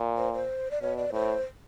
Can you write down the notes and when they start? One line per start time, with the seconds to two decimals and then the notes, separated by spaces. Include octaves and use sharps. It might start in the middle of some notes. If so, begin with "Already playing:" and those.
Already playing: A#2
0.17 C5
0.33 C5
0.71 D5
0.82 B2 C#5
0.97 D5
1.13 A2 C5